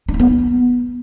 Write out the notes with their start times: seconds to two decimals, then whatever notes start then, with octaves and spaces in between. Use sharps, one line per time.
0.09 D4
0.14 D#4
0.20 B3